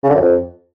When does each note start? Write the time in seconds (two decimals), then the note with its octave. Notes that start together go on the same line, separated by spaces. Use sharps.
0.04 C#3
0.09 D3
0.15 F#2
0.21 F2